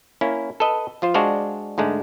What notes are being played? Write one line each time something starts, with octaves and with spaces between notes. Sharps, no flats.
A#3 C#4 E4
A4 B4 D#5
F3 F4 C5
G#3 D4 F#4 C5 D5 F5
G#2 D3 G#3 A3